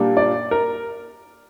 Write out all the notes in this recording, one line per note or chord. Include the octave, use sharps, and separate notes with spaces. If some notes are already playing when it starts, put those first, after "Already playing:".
Already playing: A#2 G3 A#3 D4
D5
A#4